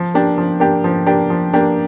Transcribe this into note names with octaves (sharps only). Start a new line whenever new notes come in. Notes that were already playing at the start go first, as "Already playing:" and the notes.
Already playing: F3
A#3 D4 G4
F3
A#3 D4 G4
F3
A#3 D4 G4
F3
A#3 D4 G4